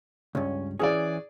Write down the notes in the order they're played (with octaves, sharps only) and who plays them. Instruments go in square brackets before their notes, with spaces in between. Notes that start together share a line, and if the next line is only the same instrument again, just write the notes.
[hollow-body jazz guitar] C#2 G2 [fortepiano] C#4
[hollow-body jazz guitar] E3 C#4 [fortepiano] G#4 D5